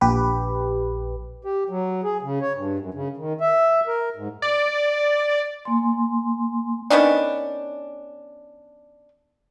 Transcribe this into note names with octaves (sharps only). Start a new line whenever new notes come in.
A#1 G4 B4
G4
F#3
G#4
C#3
C#5
G2
F#2
C#3
D#3
E5
A#4
G#2
D5
A#3 G#5 C6
D#3 B3 C#4 D4